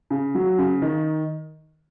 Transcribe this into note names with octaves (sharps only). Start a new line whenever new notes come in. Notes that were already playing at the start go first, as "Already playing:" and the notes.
C#3
F#3
C#3
D#3